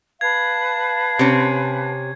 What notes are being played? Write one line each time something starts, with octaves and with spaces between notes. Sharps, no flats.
B4 F5 A5 G#6
C3 C#4